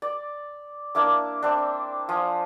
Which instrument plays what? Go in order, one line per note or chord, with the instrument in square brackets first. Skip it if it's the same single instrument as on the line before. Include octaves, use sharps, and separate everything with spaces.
[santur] D5
A#3 D4 E4 D6
C4 D4
F3 G#5